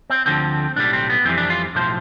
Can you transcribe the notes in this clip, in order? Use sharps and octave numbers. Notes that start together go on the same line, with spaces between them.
C4
D2 D3 F3 C4
B1 A2 G3 D4
C4
B3
F2 E3 G3 C4
D4
F4
B1 A2 F3 C5